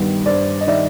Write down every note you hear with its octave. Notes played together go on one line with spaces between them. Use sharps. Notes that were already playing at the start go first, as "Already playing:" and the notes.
Already playing: G2 D#3 G3 B3
G2 C5 D5
D#5
D#3 G3 D5 E5